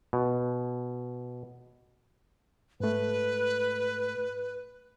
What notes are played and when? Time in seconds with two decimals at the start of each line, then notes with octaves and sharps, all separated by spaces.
0.13 B2
2.80 G#2 A3 B4